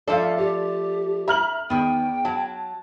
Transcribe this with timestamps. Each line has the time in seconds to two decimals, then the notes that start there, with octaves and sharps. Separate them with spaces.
0.08 F3 A3 A4 D5 F5
0.38 G4 D5
1.28 E5 A#5 F6 F#7
1.70 E2 D#3 B3 G5
2.25 F#3 A5